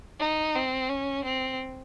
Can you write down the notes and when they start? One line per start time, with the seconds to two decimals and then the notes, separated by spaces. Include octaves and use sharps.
0.20 D#4
0.56 C4
0.89 C#4
1.24 C4